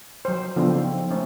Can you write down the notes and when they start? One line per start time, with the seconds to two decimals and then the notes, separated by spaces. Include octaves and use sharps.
0.25 F#3 C5
0.56 C#3 F3 B3 D4 F4 A4
0.75 C4 D#4
1.11 A3 C4 C#4